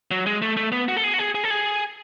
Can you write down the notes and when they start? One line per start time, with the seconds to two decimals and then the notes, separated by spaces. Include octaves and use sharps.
0.11 F#3
0.26 G#3
0.42 A3
0.57 A3
0.72 B3
0.88 F#4
0.97 A4
1.04 G#4
1.14 F#4
1.19 G#4
1.35 G#4
1.44 A4
1.50 G#4